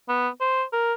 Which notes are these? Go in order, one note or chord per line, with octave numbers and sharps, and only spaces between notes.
B3
C5
A#4